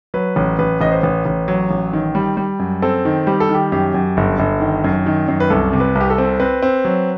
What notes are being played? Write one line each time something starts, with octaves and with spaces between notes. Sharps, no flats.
F#3 B4
A1
A1 B4
A1 D#5
C5
A1 B4
A1
F#3
A1
D#3
G3
G3
F#2
C4 A4
D#3
G3 G4
A4
D#3
G4
F#2 G4
F#2
G1
G1
D#3
F#2
D#3
F#2
B4
C2 A4
C3
B4
C2
G4
A4
C4
C4 B4
C4
F#3